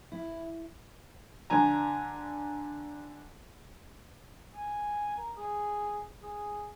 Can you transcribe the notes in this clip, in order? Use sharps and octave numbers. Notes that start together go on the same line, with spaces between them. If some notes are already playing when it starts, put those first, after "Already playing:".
E4
D3 G#5 A#5
G#5
A#4
G#4
G#4